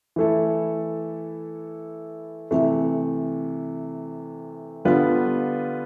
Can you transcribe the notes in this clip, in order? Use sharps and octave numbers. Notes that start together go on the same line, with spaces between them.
E3 A3 E4 A4
C3 E3 A3
D3 G3 B3 F4 B4